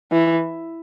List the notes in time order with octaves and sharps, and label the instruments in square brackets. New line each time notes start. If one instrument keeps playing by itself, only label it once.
[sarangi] E3